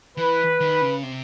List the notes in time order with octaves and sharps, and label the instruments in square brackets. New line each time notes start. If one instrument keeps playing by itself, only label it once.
[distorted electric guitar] E3 [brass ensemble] B4
[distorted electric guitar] D#3
C#3
C3